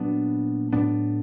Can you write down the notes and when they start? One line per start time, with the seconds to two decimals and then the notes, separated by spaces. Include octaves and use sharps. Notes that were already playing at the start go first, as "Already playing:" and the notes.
Already playing: A#2 F#3 B3 D4
0.73 A2 F#3 B3 D4